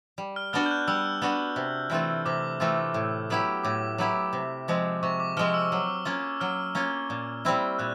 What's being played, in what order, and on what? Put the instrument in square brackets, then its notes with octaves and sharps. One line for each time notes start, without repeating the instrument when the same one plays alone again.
[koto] G3
[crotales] F6
[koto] B3 D4 F#4 [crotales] F6
[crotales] G6
F#6
[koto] G3 [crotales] E6
[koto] B3 D4 F#4
C3
E3 A3 C4 F4
[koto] C3 [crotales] D6
[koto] E3 A3 C4 F4
A2
F#3 B3 E4 G4
[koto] A2 [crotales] D6
[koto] F#3 B3 E4 G4
C3
F3 G#3 C4
[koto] C3 [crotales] C#6
[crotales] D6
[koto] F3 G#3 C4 [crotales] F6
[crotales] E6
[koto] F#3
A#3 C#4 F4
[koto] F#3 [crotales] F6
[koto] A#3 C#4 F4
A#2
G3 C4 E4
[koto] A#2 [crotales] F#6